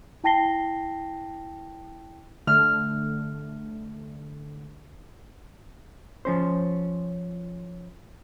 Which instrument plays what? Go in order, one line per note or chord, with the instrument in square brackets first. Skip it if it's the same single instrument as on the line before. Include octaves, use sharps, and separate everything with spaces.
[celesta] E4 G5 A5 A#6 C7 G7
[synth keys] D3 A3 [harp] F6
[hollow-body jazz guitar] F3 C#4 C5